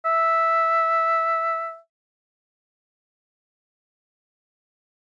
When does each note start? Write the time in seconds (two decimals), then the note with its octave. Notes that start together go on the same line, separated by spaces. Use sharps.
0.05 E5